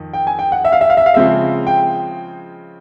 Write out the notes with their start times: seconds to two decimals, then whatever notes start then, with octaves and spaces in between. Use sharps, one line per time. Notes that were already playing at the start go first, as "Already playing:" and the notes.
Already playing: F2 D#3
0.13 G5
0.27 G#5
0.39 G5
0.52 F#5
0.65 E5
0.72 F5
0.81 E5
0.90 F5
0.97 E5
1.06 F5
1.14 C#3 F3 G#3 C4 E5
1.67 G5